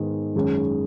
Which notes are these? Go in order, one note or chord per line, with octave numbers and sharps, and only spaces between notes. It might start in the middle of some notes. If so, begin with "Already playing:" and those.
Already playing: G#2 D#3 G#3 B3
F#2 D#3 G#3 C#4 G#4